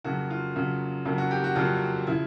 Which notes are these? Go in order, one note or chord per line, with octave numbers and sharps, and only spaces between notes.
F2 C#3 F#3 A#3 F#4
F4
F2 C#3 F#3 A#3
F2 C#3 F#3 A#3
F#4
G4
F#4
F2 C#3 F#3 A#3 F4
C#3 F3 E4